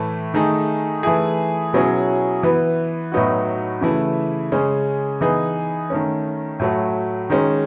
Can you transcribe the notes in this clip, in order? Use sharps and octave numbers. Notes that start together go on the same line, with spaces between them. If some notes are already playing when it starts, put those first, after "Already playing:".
Already playing: A2 E3 A3
D#3 A3 D#4 G#4
E3 A3 E4 G#4
B2 F#3 C#4 E4 G#4
E3 B3 E4
A2 F#3 B3 D#4 F#4
C#3 E3 A3 E4
C#3 G#3 C#4 G#4
E3 B3 D#4 G#4
D#3 A3 C#4
A2 F#3 A3
D#3 G#3 C#4